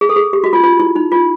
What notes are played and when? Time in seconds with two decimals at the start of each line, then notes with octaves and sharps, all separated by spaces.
0.01 G#4
0.09 A4
0.16 G#4
0.33 G4
0.44 F#4
0.53 F4
0.63 F4
0.80 E4
0.96 D#4
1.12 F4